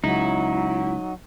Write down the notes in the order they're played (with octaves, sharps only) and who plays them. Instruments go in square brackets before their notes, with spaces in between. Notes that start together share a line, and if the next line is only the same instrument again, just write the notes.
[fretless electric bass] C#2 [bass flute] F#3 [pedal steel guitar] D#4 [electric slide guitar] E4